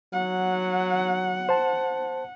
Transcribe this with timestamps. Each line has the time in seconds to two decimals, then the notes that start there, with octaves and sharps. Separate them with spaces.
0.13 F#3 F#5
1.49 C5 A5